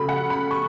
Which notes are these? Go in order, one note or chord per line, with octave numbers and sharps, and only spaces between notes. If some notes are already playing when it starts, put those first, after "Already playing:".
Already playing: C#3 F#3 A3 B5
F#5
B5
C#6